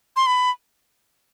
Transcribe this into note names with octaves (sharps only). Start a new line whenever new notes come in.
C6
B5